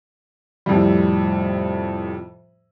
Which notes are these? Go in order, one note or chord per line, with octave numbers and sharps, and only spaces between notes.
F2 A2 C3 G3